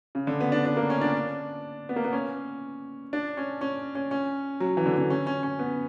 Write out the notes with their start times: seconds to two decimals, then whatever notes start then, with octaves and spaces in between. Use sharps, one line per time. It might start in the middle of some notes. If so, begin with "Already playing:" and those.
0.15 C#3
0.27 D3
0.41 B3
0.52 D4
0.65 D4
0.77 A#3
0.90 C#4
1.01 D4
1.89 B3
1.96 A#3
2.04 B3
2.13 C#4
3.13 D4
3.37 C#4
3.61 C#4
3.95 C#4
4.11 C#4
4.60 F#3
4.77 E3
4.86 D3
4.97 D3
5.10 C#4
5.27 C#4
5.43 C#4
5.59 B3